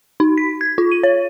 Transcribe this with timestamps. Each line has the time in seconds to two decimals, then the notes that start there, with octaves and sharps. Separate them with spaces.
0.20 D#4
0.38 B6
0.61 G#6
0.78 F4
0.92 D#7
1.03 C#5